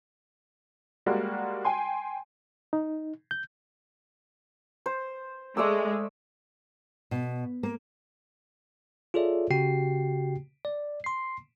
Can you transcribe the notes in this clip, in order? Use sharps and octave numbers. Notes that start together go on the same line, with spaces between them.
G3 G#3 A#3 F#4
G5 G#5 C6
D#4
G6
C5
G#3 A3 D5 E6
B2
A#3
F4 G#4 A4 C#5 D5 E5
C#3 F#4 G4 G5 C7
D5
C6 C7